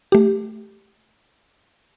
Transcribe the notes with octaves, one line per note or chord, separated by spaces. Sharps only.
A3 G4